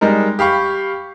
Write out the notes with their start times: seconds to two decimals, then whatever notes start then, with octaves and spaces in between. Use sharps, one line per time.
0.01 G3 G#3 D#4 A#4
0.39 G4 F5 B5 C#6